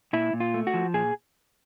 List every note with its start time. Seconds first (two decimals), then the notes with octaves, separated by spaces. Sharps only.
0.13 A#2 E4
0.33 A#2
0.40 F4
0.54 A3
0.67 F#4
0.74 F3
0.94 A#2 G#4